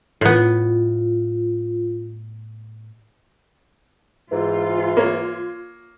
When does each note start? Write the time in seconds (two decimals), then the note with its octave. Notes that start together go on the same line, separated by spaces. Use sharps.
0.21 A2 B3 F4
4.31 G#2 E3 F4
4.97 A#3 C#5